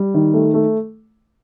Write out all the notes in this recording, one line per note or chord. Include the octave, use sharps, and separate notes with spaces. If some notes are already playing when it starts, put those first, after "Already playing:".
Already playing: G3
D#3
A3
A3